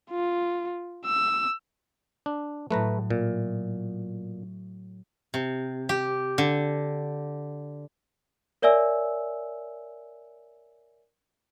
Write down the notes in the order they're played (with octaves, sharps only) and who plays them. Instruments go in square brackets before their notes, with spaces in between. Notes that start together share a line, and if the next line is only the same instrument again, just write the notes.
[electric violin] F4
E6
[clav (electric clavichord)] D4
[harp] A2 F#3 [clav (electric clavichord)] A3 B4 A#5
[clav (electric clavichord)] A#2
[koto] C3
G4
D3
[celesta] A#4 C#5 D5 E5 G#5 E6